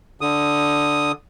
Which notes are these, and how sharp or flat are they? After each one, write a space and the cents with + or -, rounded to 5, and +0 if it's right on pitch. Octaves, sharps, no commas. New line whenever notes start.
D3 +0 D#6 +0